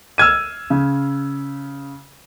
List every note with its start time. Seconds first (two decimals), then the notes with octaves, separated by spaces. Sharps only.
0.18 E6 F6 G#6 D#7
0.70 C#3